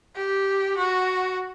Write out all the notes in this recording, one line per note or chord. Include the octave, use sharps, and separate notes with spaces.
G4
F#4